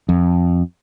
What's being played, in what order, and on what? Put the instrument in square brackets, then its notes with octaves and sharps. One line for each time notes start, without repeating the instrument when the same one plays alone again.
[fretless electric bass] F2